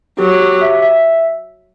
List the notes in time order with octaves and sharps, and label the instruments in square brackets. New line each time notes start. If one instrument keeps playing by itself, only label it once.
[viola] F#3 [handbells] G4
[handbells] G4
E5
E5